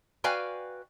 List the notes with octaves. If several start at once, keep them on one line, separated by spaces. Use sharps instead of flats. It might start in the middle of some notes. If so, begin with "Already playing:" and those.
F#4 B4 D5 F5 G5 G#5